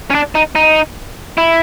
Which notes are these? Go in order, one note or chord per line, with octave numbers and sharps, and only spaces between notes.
C#4
D4
D#4
D#4
E4